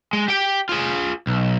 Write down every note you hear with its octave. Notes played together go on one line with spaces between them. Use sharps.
G#3
G4 G5
F4 G#4
B1